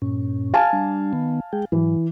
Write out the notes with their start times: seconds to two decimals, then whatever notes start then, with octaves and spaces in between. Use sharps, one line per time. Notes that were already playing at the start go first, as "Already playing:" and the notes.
0.02 G2 A#2 C#4
0.54 F5 G#5 A5 F6
0.73 G3 D4
1.13 D#3 B3
1.53 G#3 G#4 G5
1.72 G#2 E3 F#3